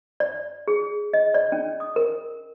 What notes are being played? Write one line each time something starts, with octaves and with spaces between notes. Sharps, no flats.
D5
G#4
D#5
D5
C#4
D#6
A#4